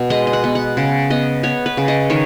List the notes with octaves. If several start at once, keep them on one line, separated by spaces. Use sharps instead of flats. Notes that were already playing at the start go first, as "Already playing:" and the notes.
Already playing: B2
G#3 D#5
D#5
F#5
B3
F#5
C#3
B3 D#5
B3 C#5
B4
C#3
D#5
D#3 C#5